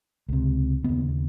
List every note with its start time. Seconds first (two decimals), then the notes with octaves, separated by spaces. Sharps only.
0.29 C#2 C3
0.84 D#2 C#3 B3